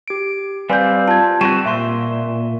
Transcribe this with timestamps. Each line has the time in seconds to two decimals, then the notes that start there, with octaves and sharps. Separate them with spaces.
0.08 G4 D7
0.69 G3 C4 B4 D5 F5 G#5 G6
1.08 F4 A5 G#6
1.41 G3 C4 F#4 C#6 D#7 E7
1.66 A#2 E5 C6